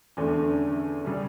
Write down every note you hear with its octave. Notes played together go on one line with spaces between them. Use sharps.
E2 D3 A3 C#4
C#3 G3 C#4